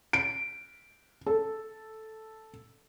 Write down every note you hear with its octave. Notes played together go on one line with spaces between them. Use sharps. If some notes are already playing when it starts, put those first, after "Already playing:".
D7
A4